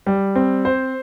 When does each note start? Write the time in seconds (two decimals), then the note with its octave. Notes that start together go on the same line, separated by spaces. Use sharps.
0.06 G3
0.35 C4
0.65 C5